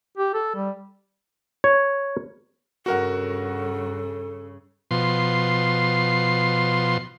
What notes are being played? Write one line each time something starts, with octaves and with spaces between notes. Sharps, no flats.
G4
A4
G3
C#5
G2 C#3 F#4 A4 A#4 F#5
B2 F3 C6